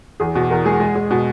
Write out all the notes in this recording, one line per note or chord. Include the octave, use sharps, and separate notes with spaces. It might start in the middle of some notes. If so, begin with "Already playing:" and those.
E2 G#4
B2
E2 A#4
G#3 G#4
G#3
G#3
B2